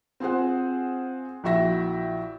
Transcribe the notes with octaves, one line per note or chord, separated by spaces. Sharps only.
C4 F4 G#4 C5 F#5
A#1 E4 F#4 E5 A#6